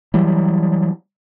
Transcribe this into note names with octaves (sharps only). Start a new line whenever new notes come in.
E3 F#3 G3